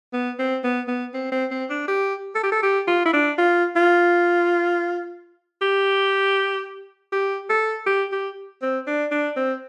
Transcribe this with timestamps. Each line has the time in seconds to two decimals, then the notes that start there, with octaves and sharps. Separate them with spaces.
0.13 B3
0.39 C4
0.64 B3
0.88 B3
1.14 C4
1.32 C4
1.51 C4
1.70 D4
1.88 G4
2.35 A4
2.43 G4
2.52 A4
2.62 G4
2.87 F4
3.05 E4
3.13 D4
3.38 F4
3.76 F4
5.62 G4
7.12 G4
7.49 A4
7.86 G4
8.12 G4
8.62 C4
8.87 D4
9.11 D4
9.36 C4